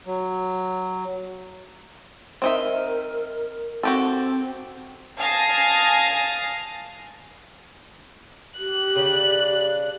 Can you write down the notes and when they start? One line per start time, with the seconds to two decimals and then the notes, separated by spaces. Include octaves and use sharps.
0.06 F#3
2.42 C4 D#4 A#4 E5
3.83 C4 F#4 G4 A4
5.19 F5 G#5 A5 D#6 A#6 C7
8.58 G4 F#6
8.95 C#3 D4